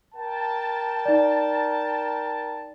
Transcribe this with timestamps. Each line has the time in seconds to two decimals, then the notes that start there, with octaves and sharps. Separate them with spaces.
0.15 A#4 G5 A5
1.05 D#4 D5